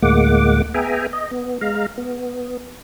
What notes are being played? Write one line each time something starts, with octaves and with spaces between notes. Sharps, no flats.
D2 A2 G#3 A#3 F#5 D6
B3 G#4 E5 G5 G#5 A#5
D#5
B3
G#3 F5 A#5
B3